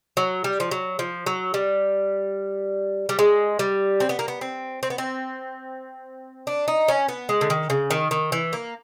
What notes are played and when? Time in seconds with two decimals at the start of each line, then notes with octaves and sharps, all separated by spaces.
0.17 F#3
0.44 G3
0.60 F3
0.71 F#3
0.99 F3
1.26 F#3
1.54 G3
3.09 G3
3.19 G#3
3.59 G3
4.00 C4
4.09 B3
4.19 A#3
4.28 B3
4.41 C4
4.83 C4
4.90 B3
4.98 C4
6.47 D4
6.68 D#4
6.88 C#4
7.09 B3
7.29 G#3
7.41 D3
7.50 D#3
7.70 C#3
7.91 D#3
8.11 D#3
8.32 E3
8.53 A#3